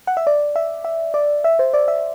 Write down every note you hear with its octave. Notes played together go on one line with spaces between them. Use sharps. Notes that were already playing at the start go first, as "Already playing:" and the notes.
F#5
E5
D5
E5
E5
D5
E5
C5
D5
E5